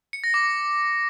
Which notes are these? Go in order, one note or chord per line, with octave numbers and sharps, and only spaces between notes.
C#7
A#6
D6